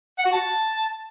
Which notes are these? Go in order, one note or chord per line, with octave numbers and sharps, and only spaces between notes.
F#5
F#4
A5